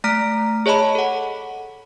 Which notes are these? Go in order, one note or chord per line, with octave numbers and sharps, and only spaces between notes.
A3 A#5 F6 B6 D7
G#4 C#5 D#5 A5 B5
A4 F#5